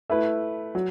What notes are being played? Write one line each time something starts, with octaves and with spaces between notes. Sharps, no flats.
A3 E4 B4
F#3